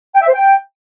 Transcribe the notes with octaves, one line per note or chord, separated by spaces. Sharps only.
G5
E5
C5
G5